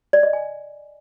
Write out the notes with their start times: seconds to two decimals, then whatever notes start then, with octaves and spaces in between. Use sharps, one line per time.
0.13 D5
0.23 D#5
0.33 G#5